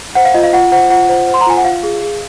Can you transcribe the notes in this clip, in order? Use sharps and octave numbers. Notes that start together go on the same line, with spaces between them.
C5 F#5
F5
F4 D#5
F5
F4 F#5
C5 F#5
F4 F#5
C5
C5
C6
A#5
F4 G#5
F#5
F4 F5
G#4
G#4